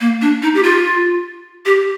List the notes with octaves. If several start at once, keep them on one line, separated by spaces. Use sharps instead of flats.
A#3
D4
D#4
G4
F4
G4